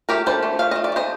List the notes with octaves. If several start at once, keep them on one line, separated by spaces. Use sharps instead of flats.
A3 G4 A#4
D4 A4 C5
A3
A3 F5
A3 D#5
D5
A3 C5 D#5